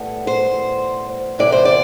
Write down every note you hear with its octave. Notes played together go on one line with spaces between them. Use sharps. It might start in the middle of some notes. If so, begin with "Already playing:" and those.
Already playing: A2 G3 B3
C5
C3 E3 B3 D5
C5
D5